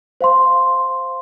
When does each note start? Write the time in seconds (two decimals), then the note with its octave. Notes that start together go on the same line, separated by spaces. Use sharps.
0.21 C5 F5 C6